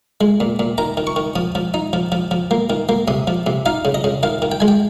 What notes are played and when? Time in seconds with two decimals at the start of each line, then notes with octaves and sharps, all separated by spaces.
0.21 G#3
0.40 A#2
0.59 A#2
0.78 D#3 A#5
0.97 D#3
1.07 C#6
1.16 D#3
1.36 F3 D#6
1.55 F3
1.74 D#4
1.93 F3
2.12 F3
2.31 F3
2.51 A#3
2.70 D#3
2.89 A#3
3.08 C3 D#6
3.27 F3
3.46 C3
3.66 D#4 F5
3.85 C#3
3.94 D#5
4.04 C#3
4.23 D#3 F5
4.42 D#3
4.52 G5
4.60 G#3 G#5
4.68 G5